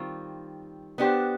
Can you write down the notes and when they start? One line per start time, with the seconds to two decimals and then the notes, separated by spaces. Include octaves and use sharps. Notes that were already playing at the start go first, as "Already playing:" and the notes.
Already playing: D#3 G3 C4 F4
0.98 B3 D4 G4 C5